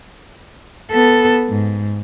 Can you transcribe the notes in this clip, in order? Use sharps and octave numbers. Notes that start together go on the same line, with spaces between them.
B3 A4
G#2